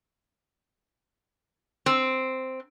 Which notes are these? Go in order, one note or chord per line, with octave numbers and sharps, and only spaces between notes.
C4